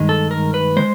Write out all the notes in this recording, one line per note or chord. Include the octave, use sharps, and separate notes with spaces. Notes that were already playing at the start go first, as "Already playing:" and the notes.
Already playing: G2 D#3 G#3
A4
A#4
B4
D#3 G#3 C5